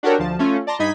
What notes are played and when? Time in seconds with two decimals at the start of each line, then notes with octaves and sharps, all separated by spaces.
0.03 D4 F#4 G4 A4 A#4 C#5
0.19 D2 F3 A5
0.39 A3 C#4 F4
0.67 D5 A5 A#5 C6
0.79 G2 D#4 D#5 B5 G#6 B6